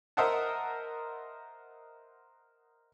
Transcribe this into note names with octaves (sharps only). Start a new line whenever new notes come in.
A#4 C5 D#5 E5 F#5 A5